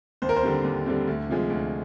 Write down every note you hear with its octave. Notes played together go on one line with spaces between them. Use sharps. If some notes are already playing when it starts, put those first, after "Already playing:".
D#2 C5
A#4
C5
D3 G3 C4
D#2
D3 G3 C4
D2
C3 F3 G#3
D2